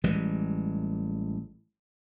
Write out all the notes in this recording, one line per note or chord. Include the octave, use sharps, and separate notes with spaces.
A1 E3 G3 G#3